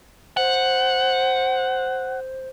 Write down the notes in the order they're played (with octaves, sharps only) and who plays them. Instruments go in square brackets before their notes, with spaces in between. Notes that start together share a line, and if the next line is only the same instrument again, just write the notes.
[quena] C5 [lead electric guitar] F#5